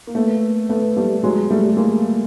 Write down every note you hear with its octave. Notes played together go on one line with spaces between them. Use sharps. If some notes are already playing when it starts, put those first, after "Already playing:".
A#3
A3 B3
A3 B3
G3 A3
F#3 G#3
G3 A3
G#3 A#3